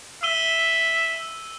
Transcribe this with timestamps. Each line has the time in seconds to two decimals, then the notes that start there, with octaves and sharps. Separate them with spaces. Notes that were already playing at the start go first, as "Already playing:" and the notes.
0.23 E5 E6 D#7 G7